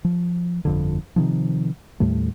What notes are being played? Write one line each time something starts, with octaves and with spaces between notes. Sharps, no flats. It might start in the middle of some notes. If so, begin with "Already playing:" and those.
F3
G1 F2 D3
C3 D#3 F3
D#2 A2 G3 A3